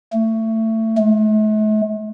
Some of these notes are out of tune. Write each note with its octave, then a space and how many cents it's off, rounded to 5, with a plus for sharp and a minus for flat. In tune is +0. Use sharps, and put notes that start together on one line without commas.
A3 +20
A3 -45